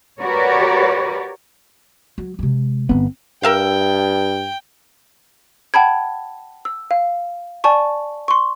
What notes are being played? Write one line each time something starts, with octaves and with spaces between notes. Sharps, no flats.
F#4 G4 A#4 B4 C#5 D5
F#3
C3 G#3
G1 E2 B3 C4
G2 A#4 E5 F5 G5
F#5 G5 A5 B5 G#6
E6
F5
D5 G#5 A5 C#6
C6 C#6